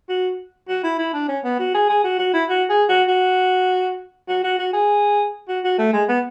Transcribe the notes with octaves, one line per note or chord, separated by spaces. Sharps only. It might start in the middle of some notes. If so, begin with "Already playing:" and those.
F#4
F#4
E4
E4
D4
C#4
B3
F#4
G#4
G#4
F#4
F#4
E4
F#4
G#4
F#4
F#4
F#4
F#4
F#4
G#4
F#4
F#4
A3
G#3
B3